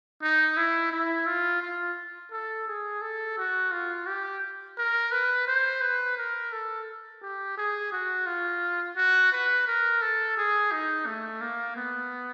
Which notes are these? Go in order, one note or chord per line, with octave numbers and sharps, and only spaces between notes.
D#4
E4
E4
F4
F4
A4
G#4
A4
F#4
F4
G4
A#4
B4
C5
B4
A#4
A4
G4
G#4
F#4
F4
F#4
B4
A#4
A4
G#4
D#4
A3
A#3
B3